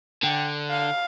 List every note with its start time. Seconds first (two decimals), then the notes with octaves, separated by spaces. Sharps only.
0.24 D3 G5
0.71 F5